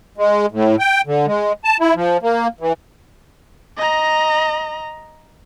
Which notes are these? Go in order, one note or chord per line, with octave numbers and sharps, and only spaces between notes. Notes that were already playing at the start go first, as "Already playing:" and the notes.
G#3
A2
G5
D3
G#3
A5
E4
F3
A#3
E3
D#5 A#5